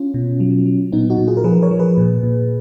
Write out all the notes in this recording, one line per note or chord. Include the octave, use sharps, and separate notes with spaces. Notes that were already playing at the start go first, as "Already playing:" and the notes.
Already playing: C#4 F4
B2
F#3
F#3
A#2 B3 D#4
D#4 F#4
A#2
F4 G#4
A#4
F3 G#4 B4
A#4 C#5
F3
G#4 B4
A#2
A#2